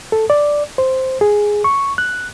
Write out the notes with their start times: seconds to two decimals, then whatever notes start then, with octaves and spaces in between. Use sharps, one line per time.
0.12 A4
0.30 D5
0.78 C5
1.21 G#4
1.64 C#6
1.98 F#6